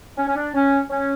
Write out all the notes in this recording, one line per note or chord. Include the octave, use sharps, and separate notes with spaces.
C#4
C#4
D4
C#4
C#4